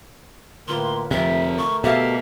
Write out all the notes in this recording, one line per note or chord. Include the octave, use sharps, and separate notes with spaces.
A2 D3 A#3 F4 A#4 B4 C6
F2 C3 A3 A#4 E5
C#6
B2 G4 A4 E5 F5